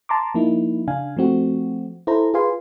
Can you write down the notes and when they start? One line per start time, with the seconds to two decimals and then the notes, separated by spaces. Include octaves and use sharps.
0.09 A5 A#5 C6 D6
0.35 F3 A#3 D#4 E4
0.88 C#3 D4 F5 G#5
1.17 F3 A3 C4 F#4
2.07 E4 A4 C5 A#5
2.34 F4 G#4 B4 F5 G#5 C6